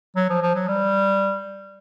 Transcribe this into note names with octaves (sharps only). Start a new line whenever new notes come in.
F#3
F3
F3
F#3
G3